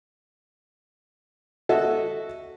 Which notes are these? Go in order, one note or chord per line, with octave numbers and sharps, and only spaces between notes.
F#4 A4 D#5 E5